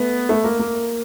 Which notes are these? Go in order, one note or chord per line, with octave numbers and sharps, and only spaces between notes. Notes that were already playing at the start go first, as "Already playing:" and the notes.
Already playing: A3 B3
A3
A#3
A#3